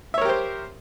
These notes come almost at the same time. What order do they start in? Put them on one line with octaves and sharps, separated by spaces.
E5 C#5 A#4 G4 C5